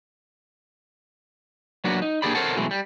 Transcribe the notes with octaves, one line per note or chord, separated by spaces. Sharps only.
F#3 A#3 B3 D4 F#4
D#4
A#3 D4 G4 G#4 D5 B5
A4 A#4 C5 C#5 F#5 A5
B2 E3 F#3 G#3 A3
G3